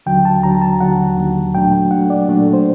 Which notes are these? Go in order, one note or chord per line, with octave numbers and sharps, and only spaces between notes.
D#2 D3 F#3 G5
A5
D#2 D3 F#3 A#5
A5
D#2 D3 F#3 F#5
D#2 D3 F#3
A#2 F#3 A3 D4 G5
A#2 F#3 A3 D4 F#5
D5
A#2 F#3 A3 D4
C5